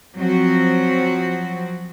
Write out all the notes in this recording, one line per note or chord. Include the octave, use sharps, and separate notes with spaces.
F3 F#3 C4 F#4